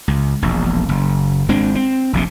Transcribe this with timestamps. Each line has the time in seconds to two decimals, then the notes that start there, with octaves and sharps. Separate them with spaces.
0.08 C#2
0.42 E1 A#1
0.89 F#1
1.49 G#1 G#3 C4 D4
1.75 C4
2.13 F1 A#1 C3